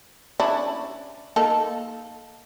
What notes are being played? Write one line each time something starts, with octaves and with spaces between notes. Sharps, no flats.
C#4 D4 E4
A#3 D#4 A4